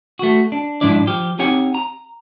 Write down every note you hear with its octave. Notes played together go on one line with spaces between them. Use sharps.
A3 F#4
D4
G#2 F3 D4 E4 D5
F3 G4
C4 D#4 G4 C#5 F#5 G#5
A#5